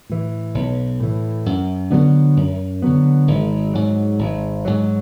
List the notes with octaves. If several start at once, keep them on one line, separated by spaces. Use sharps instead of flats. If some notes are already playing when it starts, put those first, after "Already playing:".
A2 E3
B1
A2 E3
F#2
D3 F#3 B3
F#2
D3 F#3 B3
G#1
G#2 F#3
G#1
G#2 F#3